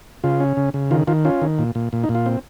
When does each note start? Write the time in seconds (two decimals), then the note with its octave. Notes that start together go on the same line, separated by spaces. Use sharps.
0.24 C#3 F4
0.40 C#4
0.57 C#3
0.74 C#3
0.91 D#3 F4
1.07 D#3 F4
1.25 C#4 F4
1.42 D#3
1.59 A#2
1.75 A#2
1.93 A#2
2.04 D#4
2.09 A#2
2.15 F4
2.26 C4